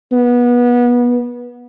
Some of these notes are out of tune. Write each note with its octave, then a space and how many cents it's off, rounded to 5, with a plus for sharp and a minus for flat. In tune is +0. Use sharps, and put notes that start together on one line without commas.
B3 -25